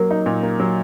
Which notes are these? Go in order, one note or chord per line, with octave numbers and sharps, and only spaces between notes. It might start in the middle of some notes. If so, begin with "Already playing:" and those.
Already playing: F#3 A#3 A#4
D#4
A#2
A#3
F#3